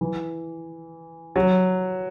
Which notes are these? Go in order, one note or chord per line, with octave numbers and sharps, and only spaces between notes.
E3
F#3